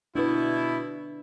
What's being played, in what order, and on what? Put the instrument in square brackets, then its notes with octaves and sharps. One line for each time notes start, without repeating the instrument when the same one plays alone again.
[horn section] B2 E4 [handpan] D4 B4